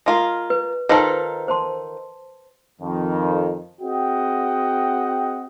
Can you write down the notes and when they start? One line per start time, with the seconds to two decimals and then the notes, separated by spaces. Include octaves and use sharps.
0.06 G#3 F4 A#4
0.50 B4
0.89 D#3 F4 A4 B4 C5
1.48 C5 A5 C6
2.81 F2 D#3
3.82 C4 F#4 G#4 D#5 F#5 G5